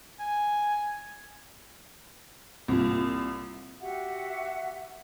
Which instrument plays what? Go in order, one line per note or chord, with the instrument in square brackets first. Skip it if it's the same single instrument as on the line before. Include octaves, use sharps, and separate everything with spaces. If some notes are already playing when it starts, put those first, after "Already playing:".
[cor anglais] G#5
[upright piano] C2 A#2
[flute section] F#4 G4 E5 F#5